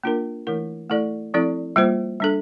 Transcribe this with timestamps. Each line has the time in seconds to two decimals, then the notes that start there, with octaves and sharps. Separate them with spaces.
0.04 A#3 D4 F4 A#4
0.47 E3 A3 E4 A#4
0.90 A3 E4 A4 D5
1.34 F3 C4 E4 A4 D5
1.76 G3 A#3 F4 C5
2.20 G3 D4 A4